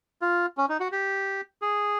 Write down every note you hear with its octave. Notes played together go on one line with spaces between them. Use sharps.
F4
C#4
D#4
F#4
G4
G#4